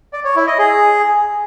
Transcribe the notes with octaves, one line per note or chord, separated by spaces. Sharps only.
D5
C#5
E4
D#5
G#4